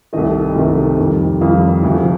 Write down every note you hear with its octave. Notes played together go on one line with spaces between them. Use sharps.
C2 C3 D#3 A3 D#5
C2 C3 D#3 A3
F2 D#3 G3
F2 D#3 G3 F5
D2 C3 F3